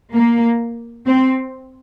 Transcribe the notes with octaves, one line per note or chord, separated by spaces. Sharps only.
A#3
C4